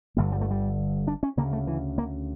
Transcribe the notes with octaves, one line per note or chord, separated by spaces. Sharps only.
G1 G2 D3 A#3
G3
A3
G3
D4
C#4
D2 C#3 A#3
A3
E3
A#3